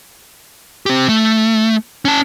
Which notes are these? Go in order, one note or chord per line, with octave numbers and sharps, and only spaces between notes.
C4 G4
A3
C#4 A5